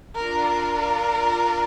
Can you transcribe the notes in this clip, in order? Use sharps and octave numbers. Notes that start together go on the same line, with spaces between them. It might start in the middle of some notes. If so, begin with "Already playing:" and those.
D4 F4 A#4
A#4